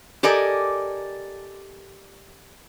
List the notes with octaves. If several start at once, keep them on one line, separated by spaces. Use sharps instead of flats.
G4 A4 A#4 D5 D#5 G#5